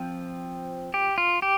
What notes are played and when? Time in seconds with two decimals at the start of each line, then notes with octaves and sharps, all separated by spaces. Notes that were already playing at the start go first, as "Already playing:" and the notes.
Already playing: F3 C4
0.94 G4
1.18 F4
1.42 G4